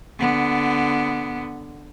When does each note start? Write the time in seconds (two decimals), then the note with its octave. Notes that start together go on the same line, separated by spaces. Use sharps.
0.19 D3 B3